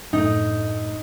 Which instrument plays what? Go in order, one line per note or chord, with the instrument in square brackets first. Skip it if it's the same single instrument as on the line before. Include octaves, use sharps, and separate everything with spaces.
[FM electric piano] F#2 A2 A3 [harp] D#4